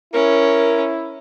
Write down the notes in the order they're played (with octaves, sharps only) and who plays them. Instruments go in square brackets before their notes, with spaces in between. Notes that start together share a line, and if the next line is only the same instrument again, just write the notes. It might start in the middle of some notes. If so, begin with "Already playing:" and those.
[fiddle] C#4 [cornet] E4 [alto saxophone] A#4